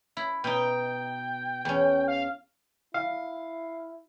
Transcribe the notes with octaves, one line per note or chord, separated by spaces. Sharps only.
E4
B2 D#4 G5
E2 C#4
F5
E4 F5